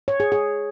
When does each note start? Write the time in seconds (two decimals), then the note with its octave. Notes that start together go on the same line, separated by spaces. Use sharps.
0.08 C#5
0.20 G#4
0.32 G#4